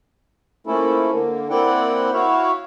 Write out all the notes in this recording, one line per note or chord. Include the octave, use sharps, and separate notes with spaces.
F3 A3 A#3 C#4 E4 A4
D3 A#3
A#3 C4 E4 D5 F#5 G5
E4 F#4 C#5 E5 F5